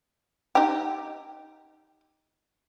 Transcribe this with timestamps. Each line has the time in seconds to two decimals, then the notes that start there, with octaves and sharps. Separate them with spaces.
0.55 D#4 G4